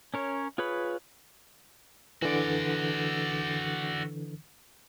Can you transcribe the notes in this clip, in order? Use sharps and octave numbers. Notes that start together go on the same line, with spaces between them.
C#4 A#4 C#5
F4 G#4 B4 C#5 B5
D3 E3 F#4 D5